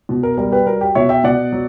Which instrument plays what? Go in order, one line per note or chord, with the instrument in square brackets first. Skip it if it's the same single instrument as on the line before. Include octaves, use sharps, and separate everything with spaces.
[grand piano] B2
A#4
G3 A#4
G4 B4
F#3 A#4
G4
B2 C#5 E5
E5 G5
B2 D5 F#5
F#3